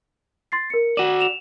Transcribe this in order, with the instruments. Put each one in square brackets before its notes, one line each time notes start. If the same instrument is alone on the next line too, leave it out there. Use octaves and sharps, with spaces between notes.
[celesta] C6 A6 C7
A#4 C#7
[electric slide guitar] F#4 D5 [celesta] D#7 E7
[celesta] E7 F7